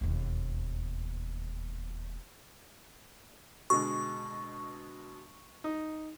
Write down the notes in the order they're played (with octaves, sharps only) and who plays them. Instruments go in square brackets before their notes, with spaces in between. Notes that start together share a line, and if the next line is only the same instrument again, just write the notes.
[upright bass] E1 D#2
[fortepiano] B2 D3 G#3 [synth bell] C#6
[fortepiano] D#4